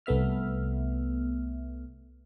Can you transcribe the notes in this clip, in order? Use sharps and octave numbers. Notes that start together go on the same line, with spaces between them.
C2 A3 B3 E5 F6